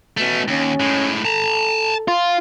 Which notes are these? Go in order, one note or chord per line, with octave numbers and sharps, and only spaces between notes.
B2 A3 C#4
D#2 C#4
A2 G#3
A4 A5 A#5
F4